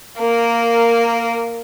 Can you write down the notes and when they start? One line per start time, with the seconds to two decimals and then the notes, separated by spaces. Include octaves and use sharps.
0.19 A#3 A#4